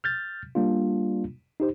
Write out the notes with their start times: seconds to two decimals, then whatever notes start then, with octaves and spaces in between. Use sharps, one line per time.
0.04 F6 G6 A6
0.55 G3 A#3 D4 F4
1.60 D#4 G4 C5